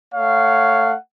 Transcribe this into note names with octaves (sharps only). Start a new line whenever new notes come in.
A3 C#5 F5 F#5